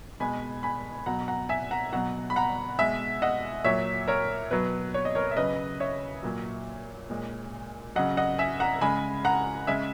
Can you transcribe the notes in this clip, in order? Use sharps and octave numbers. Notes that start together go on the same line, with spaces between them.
B2 G#3 G#5 B5
G#5 B5
B2 F#3 F#5 A#5
F#5 A#5
E5 G#5
F#5 A#5
B2 F#3 F#5 A#5
B5
F#5 A#5
B2 G#3 E5 G#5
D#5 F#5
A#2 F#3 C#5 E5
A#4 C#5
B2 F#3 B4
C#5
D#5
A#4 C#5
E5
C#3 F#3 B4 D#5
C#5 E5
A#2 F#3
A#2 G#3
C#3 F#3 D#5 F#5
D#5 F#5
E5 G#5
F#5 A#5
C#3 G#3 G#5 B5
F#5 A#5
C#3 G#3 E5 G#5